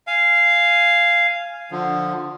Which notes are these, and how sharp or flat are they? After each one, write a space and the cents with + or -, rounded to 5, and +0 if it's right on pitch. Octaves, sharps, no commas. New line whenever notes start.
F5 -10 G#5 +0
D3 +10 F3 +15